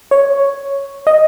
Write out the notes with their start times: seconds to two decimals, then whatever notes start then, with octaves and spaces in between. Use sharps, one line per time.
0.11 C#5
1.07 D#5